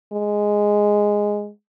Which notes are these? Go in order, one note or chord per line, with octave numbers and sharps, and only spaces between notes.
G#3